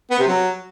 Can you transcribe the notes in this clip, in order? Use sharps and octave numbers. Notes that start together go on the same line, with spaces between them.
B3
C3
F#3